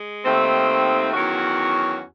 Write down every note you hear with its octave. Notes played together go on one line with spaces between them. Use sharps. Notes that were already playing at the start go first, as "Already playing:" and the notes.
Already playing: G#3
D#2 D#3 A3 C4
E2 D#3 F#3 C#4 F#4